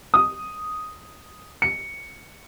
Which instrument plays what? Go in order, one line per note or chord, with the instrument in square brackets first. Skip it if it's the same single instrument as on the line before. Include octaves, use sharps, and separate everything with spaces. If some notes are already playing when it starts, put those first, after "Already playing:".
[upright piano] D#6
C#7